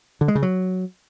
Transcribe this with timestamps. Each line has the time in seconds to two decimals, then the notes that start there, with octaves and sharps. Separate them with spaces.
0.21 D3
0.28 G#3
0.35 C#3
0.43 F#3